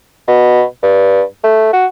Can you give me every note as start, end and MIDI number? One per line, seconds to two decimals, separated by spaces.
0.28 0.63 47
0.83 1.22 43
1.44 1.70 57
1.73 1.86 66